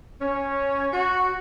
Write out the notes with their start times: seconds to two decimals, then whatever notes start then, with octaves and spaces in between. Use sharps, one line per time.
0.21 C#4
0.91 F#4